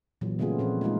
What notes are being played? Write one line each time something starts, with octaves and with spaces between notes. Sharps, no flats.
A#2 E3 F#3
C#3 G3 A3 B3 F4 G#4
A#2 F3 C4 F#4
G#3 A3 D#4 F4